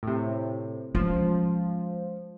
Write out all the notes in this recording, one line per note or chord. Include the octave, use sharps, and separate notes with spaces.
A2 C3
F3 G#3 C#4